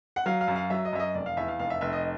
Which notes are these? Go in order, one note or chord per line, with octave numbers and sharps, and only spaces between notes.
F#5
F#3 F5
F5
F#2
F5
F#3 E5
D#5
F#2 E5
D#5
F1 D5
F5
E2 E5
F5
F1 F5
E5
F1 E5
D#5